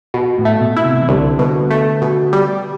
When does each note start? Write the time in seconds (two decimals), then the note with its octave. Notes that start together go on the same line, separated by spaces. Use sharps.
0.14 B2
0.38 A2
0.45 A3
0.61 B2
0.76 E4
0.85 C3
1.02 E3
1.08 C2 D3
1.39 B2
1.71 A3
2.01 B2
2.33 G3